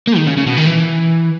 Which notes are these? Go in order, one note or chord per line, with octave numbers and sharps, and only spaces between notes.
A#3
D#3
C#3
C#3
B2
D#3
E3